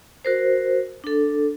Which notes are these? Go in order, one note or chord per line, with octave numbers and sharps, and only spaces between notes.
F#4 A#4 C5
D4 A4